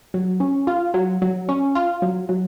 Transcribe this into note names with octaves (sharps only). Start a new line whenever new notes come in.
F#3
C#4
F4
F#3
F#3
C#4
F4
F#3
F#3